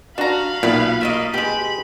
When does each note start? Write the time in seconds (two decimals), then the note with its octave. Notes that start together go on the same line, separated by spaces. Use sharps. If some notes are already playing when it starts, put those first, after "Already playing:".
0.18 D4 F#4 F5 A#5 B5
0.63 B1 A#2 B3 E4
1.01 A3 A#3 D#5
1.34 B2 G#3 G4 B5